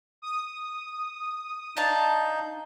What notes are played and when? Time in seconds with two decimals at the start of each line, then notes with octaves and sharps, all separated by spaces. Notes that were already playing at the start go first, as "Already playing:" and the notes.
0.22 D#6
1.77 D4 D#4 F5 A5 G6